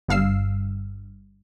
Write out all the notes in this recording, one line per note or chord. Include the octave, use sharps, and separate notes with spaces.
G1 G2 F5 E6 C7